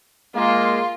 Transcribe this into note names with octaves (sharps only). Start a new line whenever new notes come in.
G#3 A#3 F4 C6